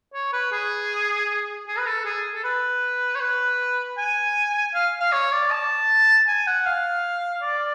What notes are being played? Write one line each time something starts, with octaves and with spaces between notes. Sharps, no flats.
C#5
B4
G#4
G#4
B4
A4
G#4
A4
B4
C#5
B4
G#5
F5
F5
C#5
D5
A5
G#5
F#5
F5
D5